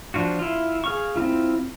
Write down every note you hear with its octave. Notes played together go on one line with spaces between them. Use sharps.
F3 D4 F4 F#4
E4 F4
G#4 F5 C#6
C4 C#4 E4 F4